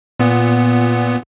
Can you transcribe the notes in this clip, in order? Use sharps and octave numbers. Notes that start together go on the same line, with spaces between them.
A#2 B3